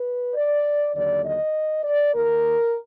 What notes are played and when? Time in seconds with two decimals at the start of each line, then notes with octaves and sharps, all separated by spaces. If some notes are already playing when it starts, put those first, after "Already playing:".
Already playing: B4
0.34 D5
0.94 D#2 D3 F#3 D5
1.23 D#5
1.83 D5
2.13 D#2 D#3 A#3 A#4